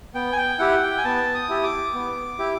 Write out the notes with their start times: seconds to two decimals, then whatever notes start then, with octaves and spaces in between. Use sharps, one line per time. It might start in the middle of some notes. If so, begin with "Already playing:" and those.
0.15 B3 G5
0.32 G#5
0.38 G5
0.59 E4 G4 F#5
0.82 G5
0.98 G#5
1.04 B3 A5
1.34 D#6
1.49 E4 G4
1.64 D6
1.94 B3
2.39 E4 G4